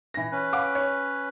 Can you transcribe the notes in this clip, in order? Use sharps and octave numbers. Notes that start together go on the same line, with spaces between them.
E3 A#6
C#4 B4
F5 F#5 D6
C#5